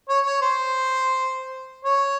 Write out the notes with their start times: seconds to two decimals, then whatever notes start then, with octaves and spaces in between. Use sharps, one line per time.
0.09 C#5
0.25 C#5
0.41 C5
1.85 C#5